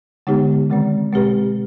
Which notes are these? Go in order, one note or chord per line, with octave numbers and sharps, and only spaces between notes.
D3 G#3 B3 D#4 G4
C3 D#3 G#3 C4
B2 G#3 C4 G4 B4